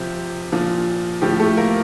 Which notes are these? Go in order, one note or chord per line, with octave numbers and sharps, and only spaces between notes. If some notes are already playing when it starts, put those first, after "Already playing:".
Already playing: C3 F3 G4
A#2 F3
A2 F3 G4
A3 A4
A#3 A#4